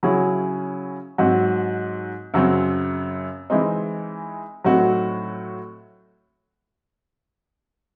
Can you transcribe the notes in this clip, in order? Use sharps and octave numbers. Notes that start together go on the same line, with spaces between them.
C#3 F#3 C#4 E4 G#4
G#2 F#3 C4 F#4
F#2 C#3 F#3 C4
E3 G#3 C4 D#4
A2 F#3 C4 D#4 F#4